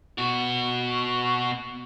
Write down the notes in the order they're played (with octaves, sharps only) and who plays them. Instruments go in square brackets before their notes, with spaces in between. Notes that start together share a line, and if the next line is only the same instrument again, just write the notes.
[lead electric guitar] B2 F#4